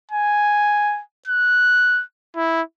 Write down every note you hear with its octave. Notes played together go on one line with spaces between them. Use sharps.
G#5
F#6
E4